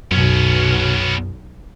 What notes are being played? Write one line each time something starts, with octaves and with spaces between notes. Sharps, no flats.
B1 F#2 B2 B3 C#4